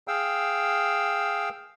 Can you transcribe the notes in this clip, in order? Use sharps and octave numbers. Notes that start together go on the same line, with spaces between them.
G#4 F5 G5 E6